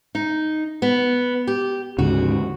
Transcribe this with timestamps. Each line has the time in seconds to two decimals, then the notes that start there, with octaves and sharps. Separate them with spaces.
0.15 D#4
0.82 B3
1.47 G4
1.99 D2 G#2 C#3 F#4